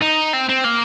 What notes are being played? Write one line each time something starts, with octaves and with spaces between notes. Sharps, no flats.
D#4
C4
C4
A#3